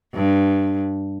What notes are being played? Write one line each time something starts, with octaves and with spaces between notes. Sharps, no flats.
G2